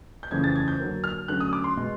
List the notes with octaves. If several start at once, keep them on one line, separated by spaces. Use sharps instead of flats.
G6
F2 C#3 E3 A3 C#4 G#6
A6
G#6
G6
D3 F#3 A#3
F6
D3 F#3 A3 C#4 F#6
D#6
D6
C6
B2 G#3